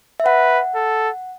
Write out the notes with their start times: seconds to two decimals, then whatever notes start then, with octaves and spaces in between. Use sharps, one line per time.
0.20 E5
0.25 B4 F#5
0.75 A4